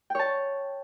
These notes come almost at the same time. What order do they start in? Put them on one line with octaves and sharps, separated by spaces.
G5 C#5 A5